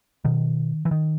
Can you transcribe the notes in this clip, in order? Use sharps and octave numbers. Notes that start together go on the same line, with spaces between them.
B2 D#3
E3
D#3